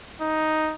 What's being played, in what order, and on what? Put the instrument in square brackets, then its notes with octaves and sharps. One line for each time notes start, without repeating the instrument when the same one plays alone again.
[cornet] D#4